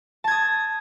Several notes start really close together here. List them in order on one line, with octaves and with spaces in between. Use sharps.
A5 G#6 D#6